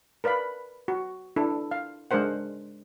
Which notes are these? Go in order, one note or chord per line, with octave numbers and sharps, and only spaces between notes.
A#4 B4 D5 F5 B5
F#4
D4 E4 A4
F5
G#3 D4 A#4 C5 F#5